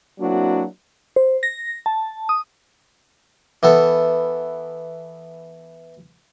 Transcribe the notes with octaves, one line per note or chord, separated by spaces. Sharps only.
F#3 A#3 C4 D4 E4 F#4
C5
A#6
A5
D#6
E3 B3 A4